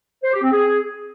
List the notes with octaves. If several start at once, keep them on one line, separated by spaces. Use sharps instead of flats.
C5
G4
C4
G#4